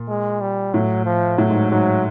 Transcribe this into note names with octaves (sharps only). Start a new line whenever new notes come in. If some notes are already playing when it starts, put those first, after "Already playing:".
Already playing: A#2
G#3
G3
A2 F#3
F3
A2 F#3
G#2
G#2 F#3